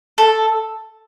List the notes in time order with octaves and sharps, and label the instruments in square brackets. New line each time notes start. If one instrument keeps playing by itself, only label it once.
[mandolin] A4